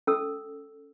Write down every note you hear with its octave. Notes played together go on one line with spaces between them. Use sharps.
C#4 A4 E6